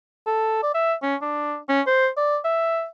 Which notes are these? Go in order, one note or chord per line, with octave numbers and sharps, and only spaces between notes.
A4
D5
E5
C#4
D4
C#4
C5
D5
E5